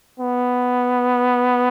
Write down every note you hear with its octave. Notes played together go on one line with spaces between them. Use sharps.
B3